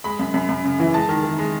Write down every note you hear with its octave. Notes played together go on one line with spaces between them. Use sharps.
G#3 B5
F#2
F#2
F#2
C#3
E3
G#3 A5
D#3
D#3
G#3